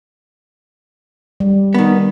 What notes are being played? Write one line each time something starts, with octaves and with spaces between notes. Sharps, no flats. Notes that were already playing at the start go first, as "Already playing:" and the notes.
G3
D#3 B3